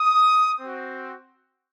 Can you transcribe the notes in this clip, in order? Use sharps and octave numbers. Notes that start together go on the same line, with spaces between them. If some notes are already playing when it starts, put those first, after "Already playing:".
Already playing: D#6
C4 F#4